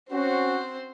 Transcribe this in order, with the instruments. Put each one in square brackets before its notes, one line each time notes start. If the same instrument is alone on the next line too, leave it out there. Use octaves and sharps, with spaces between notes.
[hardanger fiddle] C4 C5 [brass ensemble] C#4 F#4